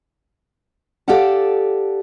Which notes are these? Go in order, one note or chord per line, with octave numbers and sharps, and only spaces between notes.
G4 A4 D5 F5 F#5 A5